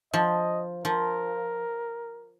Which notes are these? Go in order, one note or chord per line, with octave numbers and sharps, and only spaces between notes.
F3 D#5
F3 A#4